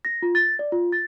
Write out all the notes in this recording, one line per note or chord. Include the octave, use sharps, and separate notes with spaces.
A#6
F4
A6
D5
F4
A6